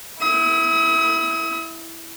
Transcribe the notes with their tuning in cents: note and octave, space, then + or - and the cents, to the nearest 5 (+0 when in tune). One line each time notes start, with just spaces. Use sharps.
E4 +0 D#6 +40